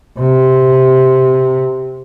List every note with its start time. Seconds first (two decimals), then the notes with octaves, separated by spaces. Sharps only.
0.18 C3